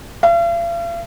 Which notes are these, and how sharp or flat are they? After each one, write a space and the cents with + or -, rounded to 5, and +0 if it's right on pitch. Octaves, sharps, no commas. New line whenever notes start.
F5 -45